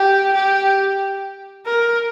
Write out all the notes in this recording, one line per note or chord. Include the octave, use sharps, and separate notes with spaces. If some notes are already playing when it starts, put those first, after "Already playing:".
Already playing: G4
G4
A#4